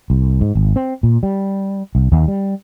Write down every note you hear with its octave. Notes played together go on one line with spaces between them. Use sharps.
C2
G#2
G#1
C4
A#2
G3
C2
D#2
G3